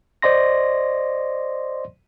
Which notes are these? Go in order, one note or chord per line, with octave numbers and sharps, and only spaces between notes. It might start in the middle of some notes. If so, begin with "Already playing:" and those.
C5 D5 D#5 C6 A#6